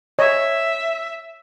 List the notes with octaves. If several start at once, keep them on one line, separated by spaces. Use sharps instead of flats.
C#5 D#5 E5